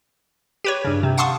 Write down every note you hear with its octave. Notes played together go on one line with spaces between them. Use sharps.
G4 B4 C#5
G2 C#3
C3
F5 F#5 A5 C6 C#6 D#6